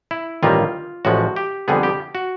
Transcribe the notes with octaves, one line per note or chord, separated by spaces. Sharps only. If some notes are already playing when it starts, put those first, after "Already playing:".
E4
A1 G2 D#3 G3 A#3 F4
A1 A2 F3 G#3 F#4
G4
F2 D3 G3 B3 G#4
G4
F#4